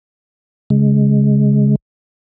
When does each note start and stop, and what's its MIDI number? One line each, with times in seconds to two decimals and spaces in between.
0.70 1.76 49
0.70 1.76 56